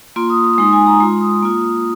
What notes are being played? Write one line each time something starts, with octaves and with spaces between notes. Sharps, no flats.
A#3 F4 C6
D#6
C6
D#6
G#3 D#4 C6
G#5
A#5
G#3 F4 C6
D#6
A#3 F4